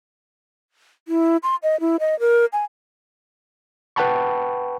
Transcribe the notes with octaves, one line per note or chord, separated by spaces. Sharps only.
E4
C6
D#5
E4
D#5
A#4
G#5
B4 F#5 G5 A5 B5 C#6